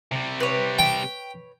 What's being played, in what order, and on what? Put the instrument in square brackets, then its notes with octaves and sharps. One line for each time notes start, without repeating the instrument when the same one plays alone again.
[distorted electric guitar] C3 G3
[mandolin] B4 C#5
[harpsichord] G5